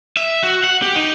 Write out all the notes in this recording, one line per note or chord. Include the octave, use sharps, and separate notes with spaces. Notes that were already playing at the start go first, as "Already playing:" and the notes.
E5
F#4
F#5
G4
D#4